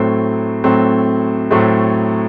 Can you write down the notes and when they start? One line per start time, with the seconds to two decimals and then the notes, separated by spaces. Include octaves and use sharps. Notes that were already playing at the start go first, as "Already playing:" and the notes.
Already playing: A2 F#3 A3 C4
0.64 A2 F#3 A3 C4
1.51 A2 F#3 A3 C4